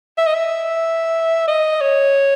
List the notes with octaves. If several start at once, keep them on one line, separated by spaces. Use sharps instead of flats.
E5
D#5
E5
D#5
C#5